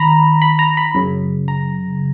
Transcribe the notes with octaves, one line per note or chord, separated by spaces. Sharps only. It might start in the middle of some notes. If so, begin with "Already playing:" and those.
Already playing: D#3 A#5 B5
B5
A#5
B5
F#2 C#3
A#5